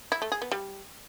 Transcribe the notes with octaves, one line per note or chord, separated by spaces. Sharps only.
E4
A3
G#4
B3
G3